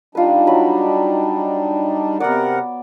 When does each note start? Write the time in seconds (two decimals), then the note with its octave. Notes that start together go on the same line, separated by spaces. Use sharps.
0.15 G3 D4 D#4 F4 B4
0.47 F#3 B5
2.20 C3 B3 A#4 D5 F#5